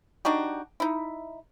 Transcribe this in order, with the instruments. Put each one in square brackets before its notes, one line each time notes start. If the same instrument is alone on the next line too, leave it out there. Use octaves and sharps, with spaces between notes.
[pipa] D4 D#4 F#4 G4
D#4 E4